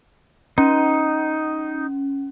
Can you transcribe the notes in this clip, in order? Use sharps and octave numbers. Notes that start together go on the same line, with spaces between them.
C#4 D#4